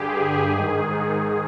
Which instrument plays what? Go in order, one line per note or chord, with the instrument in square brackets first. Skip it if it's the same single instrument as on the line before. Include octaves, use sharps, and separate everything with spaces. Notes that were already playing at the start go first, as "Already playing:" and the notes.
Already playing: [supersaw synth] G2 D3 G4 G#4
G#2 D#3